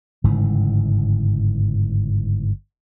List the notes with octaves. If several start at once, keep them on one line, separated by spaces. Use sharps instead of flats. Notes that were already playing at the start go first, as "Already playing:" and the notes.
G1 G#2 C#3 E3